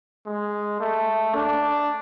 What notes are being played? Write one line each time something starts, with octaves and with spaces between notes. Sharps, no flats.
G#3
A3
D4